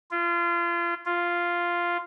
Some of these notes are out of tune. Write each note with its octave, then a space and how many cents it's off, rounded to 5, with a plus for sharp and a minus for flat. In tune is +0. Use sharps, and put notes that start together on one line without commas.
F4 -30
F4 -5